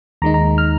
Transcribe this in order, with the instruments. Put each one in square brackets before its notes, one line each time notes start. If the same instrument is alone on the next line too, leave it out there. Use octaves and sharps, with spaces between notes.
[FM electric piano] D#2 D#3 G#3 D#4 A#5
A#5
F6